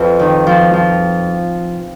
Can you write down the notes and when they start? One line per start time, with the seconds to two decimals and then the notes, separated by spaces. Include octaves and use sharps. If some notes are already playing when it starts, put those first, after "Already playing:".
Already playing: F2 B4
0.19 D#3
0.47 F3
0.74 F3